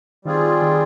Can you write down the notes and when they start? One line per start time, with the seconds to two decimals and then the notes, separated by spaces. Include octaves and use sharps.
0.25 D#3 G3 C4 D#4 F4 G#4
0.62 D#3 D#4